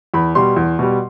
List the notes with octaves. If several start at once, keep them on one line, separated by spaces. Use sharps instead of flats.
E2 B5
B2 G3 C6
E2
B2 G3